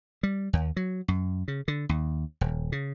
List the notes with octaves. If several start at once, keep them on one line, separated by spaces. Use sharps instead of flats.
G3
D#2
F#3
F#2
C#3
D3
D#2
D#1
C#3